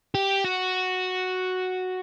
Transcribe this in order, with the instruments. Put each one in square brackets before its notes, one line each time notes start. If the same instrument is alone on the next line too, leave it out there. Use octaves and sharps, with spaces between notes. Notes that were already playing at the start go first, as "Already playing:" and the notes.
[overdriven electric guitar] G4
F#4